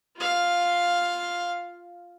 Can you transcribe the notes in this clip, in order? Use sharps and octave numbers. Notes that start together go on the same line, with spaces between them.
F4 F5